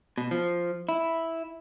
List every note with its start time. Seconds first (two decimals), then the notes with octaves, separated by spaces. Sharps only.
0.18 B2
0.31 F3
0.89 E4